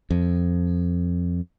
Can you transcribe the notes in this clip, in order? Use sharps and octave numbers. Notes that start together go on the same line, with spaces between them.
F2